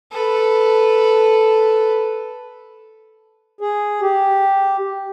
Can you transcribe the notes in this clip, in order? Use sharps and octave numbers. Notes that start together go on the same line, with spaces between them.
A4 B4
G#4
G4